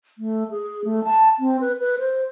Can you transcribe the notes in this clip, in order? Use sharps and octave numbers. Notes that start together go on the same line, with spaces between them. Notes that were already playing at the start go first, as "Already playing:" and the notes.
A3
G#4
A3
A5
C4
B4
B4
C5